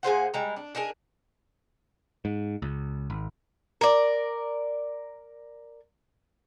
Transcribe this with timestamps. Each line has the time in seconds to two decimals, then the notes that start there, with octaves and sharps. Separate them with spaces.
0.03 A#2 G#4 C5 F#5
0.34 G3 G#3 A#5
0.57 D4
0.75 D4 D#4 G#4 A#4
2.25 G#2
2.62 C#2
3.10 G#1
3.81 A#4 D5